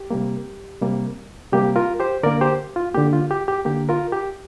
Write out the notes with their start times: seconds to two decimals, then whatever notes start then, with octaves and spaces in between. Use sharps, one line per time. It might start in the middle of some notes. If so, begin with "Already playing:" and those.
Already playing: G4
0.11 C3 G3 A#3
0.82 C3 G3 A#3
1.52 C3 G3 A#3 G4
1.76 F4 A#4
2.00 G4 C5
2.23 D3 A#3 A#4 D5
2.41 G4 C5
2.76 F4
2.94 D3 A#3 G4
3.13 F4
3.31 G4
3.48 G4
3.65 D3 A#3 G4
3.89 F4 A#4
4.12 G4